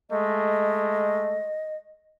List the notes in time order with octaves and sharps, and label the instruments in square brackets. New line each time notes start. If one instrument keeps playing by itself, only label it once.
[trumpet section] G#3 A3 [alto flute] D#5